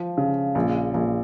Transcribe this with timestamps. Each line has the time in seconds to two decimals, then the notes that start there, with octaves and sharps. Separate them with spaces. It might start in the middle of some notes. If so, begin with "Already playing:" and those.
Already playing: F3
0.18 C#3
0.55 A#1
0.94 A#1